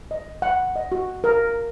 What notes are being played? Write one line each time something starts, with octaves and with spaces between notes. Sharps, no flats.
D#5
F#5
D#5
F#4
A#4